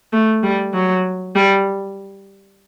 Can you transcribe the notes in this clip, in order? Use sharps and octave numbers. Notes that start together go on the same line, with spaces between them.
A3
G3
F#3
G3